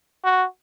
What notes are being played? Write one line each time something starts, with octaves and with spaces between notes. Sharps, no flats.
F#4